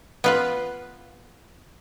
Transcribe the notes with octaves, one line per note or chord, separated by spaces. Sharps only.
B3 F4 B4